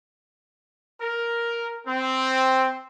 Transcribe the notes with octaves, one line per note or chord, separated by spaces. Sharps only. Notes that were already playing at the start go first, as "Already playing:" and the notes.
A#4
C4